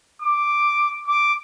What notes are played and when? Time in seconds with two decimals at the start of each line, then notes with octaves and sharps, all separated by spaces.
0.22 D6
1.07 D6